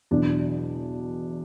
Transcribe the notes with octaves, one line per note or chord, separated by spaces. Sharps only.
E2 B2 F#3 D4